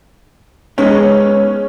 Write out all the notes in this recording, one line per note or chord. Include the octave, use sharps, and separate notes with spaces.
G#3 B3 C#4 D#4